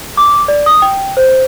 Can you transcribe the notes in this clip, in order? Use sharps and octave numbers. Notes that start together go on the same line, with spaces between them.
D6
D5
D#6
G5
C5